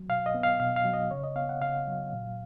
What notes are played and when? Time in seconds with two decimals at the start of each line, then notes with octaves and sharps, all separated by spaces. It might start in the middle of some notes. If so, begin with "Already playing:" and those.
Already playing: F#3
0.08 B2 F5
0.26 D#5
0.34 B3
0.43 F5
0.60 B2 F5
0.76 F5
0.85 F#3
0.93 D#5
1.11 C#3 C#5
1.23 D#5
1.36 B3 F5
1.49 F#5
1.61 C#3 F5
1.87 F#3
2.13 A#2